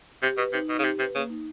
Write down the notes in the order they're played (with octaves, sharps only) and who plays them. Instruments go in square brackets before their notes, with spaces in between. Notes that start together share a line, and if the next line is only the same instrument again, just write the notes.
[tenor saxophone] C3 [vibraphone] G4
[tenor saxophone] B2 [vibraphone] B4
[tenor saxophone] C3 [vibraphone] D#4
[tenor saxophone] B2 [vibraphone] D#4
[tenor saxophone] C#3
[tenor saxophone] C3 [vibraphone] G4
[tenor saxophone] C3 [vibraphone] B4
[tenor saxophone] C#3 [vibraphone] A#3
[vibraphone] D#4